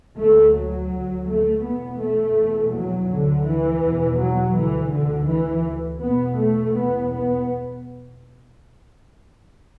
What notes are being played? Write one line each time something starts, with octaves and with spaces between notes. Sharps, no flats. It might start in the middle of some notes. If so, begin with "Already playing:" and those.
D2 A3
F#3
D2
A3
E2 B2 B3
A3
E2 B2
F#3
D2 D3
E3
E2 B2
F#3
D2 E3
D3
D2 E3
E2 B2 B3
A3
E2 B2 B3
B3